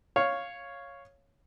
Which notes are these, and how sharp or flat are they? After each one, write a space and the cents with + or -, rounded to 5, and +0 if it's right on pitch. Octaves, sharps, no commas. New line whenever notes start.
C#5 +0 F5 +0